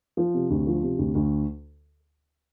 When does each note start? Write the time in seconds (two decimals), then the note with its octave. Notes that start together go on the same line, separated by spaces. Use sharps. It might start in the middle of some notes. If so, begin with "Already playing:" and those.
0.17 F3
0.34 C3
0.50 D2
0.67 F3
0.83 C3
0.98 D2
1.15 D2